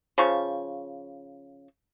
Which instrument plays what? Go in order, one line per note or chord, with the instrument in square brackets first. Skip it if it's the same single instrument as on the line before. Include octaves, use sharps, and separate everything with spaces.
[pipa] C#3 F3 C#6